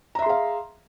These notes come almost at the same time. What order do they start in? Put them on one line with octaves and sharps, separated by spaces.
A#5 E5 C6 G#4 F5